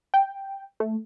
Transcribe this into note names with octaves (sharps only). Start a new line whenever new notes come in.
G5
A3